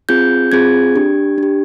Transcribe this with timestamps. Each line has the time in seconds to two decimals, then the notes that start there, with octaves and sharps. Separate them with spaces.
0.09 C4 F4 G#4 G6
0.52 C4 F4 G#4 G#6
0.96 D4 G4
1.38 D4 G4